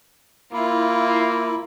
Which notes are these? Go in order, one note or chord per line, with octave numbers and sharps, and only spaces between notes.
A#3 E4 F4